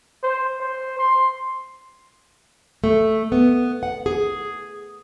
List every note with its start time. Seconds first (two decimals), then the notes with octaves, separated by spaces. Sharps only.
0.23 C5
0.60 C5
0.99 C6
2.84 A3
3.32 B3
3.83 F#5
4.06 G#4